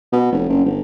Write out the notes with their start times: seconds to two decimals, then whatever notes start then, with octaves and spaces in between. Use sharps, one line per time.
0.12 B2
0.32 F1
0.48 F#1
0.64 G1